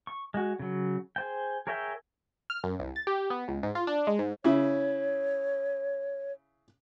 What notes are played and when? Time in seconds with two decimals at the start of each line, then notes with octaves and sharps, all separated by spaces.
0.07 C#6
0.34 G#3 F#4
0.59 C#3 F#3
1.16 G#4 C5 G5
1.67 G#4 A#4 C#5 E5 G5
2.50 F6
2.64 F#2
2.79 C2
2.96 A6
3.07 G4
3.30 B3
3.48 C#2
3.63 G#2
3.75 F4
3.87 D4
4.07 G#3
4.19 G#2
4.44 C#3 E4 C#5